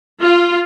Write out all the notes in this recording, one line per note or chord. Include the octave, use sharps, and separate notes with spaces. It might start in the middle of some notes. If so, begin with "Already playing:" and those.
F4